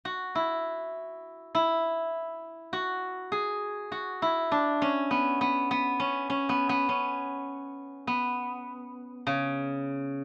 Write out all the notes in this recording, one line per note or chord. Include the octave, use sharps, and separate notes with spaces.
F#4
E4
E4
F#4
G#4
F#4
E4
D4
C#4
B3
B3
B3
C#4
C#4
B3
B3
C#4
B3
C#3